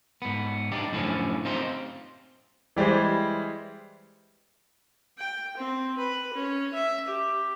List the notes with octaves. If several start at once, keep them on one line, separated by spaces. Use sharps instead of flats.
G#2 B3
D4 D#4 G4
F#2 A2 D3 E3 F3 C#4
C4 D#4 F4 G4 C5
E3 G3 G#3 C5
G5
C4
B4
C#4
E5
G4